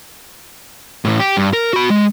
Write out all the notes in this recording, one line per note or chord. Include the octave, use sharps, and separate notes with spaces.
A2 E3
G4
G2
A#4
F#4 B5
G#3